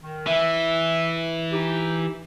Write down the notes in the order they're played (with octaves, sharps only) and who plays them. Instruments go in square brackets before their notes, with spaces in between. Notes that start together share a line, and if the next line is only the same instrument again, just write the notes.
[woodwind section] D#3
[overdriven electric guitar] E3 [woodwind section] E5
[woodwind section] D#4 G4